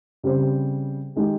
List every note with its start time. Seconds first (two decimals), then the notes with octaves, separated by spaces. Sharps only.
0.23 C#3 G3 C4 G4 C5
1.16 D#3 G#3 D#4 G4